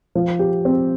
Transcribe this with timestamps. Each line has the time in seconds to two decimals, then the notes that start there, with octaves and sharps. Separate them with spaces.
0.15 F3
0.39 G4
0.65 C4